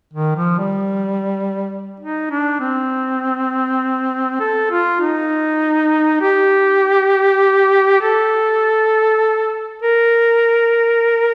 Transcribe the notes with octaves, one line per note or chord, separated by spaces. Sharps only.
D#3
F3
G3
D#4
D4
C4
A4
F4
D#4
G4
A4
A#4